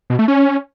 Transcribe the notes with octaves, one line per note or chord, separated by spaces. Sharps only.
B2
A3
C#4